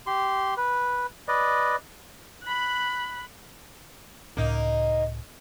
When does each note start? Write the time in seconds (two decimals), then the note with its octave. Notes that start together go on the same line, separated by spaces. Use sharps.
0.07 G4 C6
0.57 B4
1.28 B4 D5 D#5
2.43 B5 F#6
4.37 C#2 A2 A#3 C#4 D#4